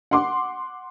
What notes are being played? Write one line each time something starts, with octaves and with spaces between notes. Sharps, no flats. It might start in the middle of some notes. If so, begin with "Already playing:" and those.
F#5 C6 D6